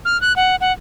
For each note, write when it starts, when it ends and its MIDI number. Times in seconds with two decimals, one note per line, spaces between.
0.05 0.20 89
0.21 0.35 90
0.36 0.56 78
0.61 0.72 78